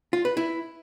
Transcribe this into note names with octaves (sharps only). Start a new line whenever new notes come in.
F4
B4
E4